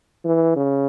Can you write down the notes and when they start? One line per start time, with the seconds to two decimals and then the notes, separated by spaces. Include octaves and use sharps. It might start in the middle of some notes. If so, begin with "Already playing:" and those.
0.25 E3
0.57 C#3